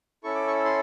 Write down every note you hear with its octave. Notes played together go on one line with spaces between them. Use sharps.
C#4 E4 A4 C#6
D6
C#6
C6